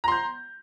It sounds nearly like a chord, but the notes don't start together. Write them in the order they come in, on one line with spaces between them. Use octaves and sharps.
A#5 C6 G6